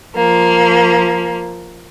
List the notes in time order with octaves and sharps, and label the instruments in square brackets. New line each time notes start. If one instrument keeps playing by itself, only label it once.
[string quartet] F3 A#3